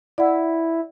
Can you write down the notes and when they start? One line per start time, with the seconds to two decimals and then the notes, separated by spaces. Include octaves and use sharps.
0.18 E4 D5 F#5